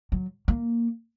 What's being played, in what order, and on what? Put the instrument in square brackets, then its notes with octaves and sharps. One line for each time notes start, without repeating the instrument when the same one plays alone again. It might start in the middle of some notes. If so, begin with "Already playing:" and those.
[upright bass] F#3
A#3